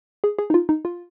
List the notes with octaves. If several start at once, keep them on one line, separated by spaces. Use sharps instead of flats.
G#4
G#4
D#4
F4
D#4
F4